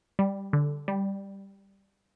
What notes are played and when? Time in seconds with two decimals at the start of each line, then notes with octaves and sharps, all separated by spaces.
0.19 G3
0.53 D3
0.88 G3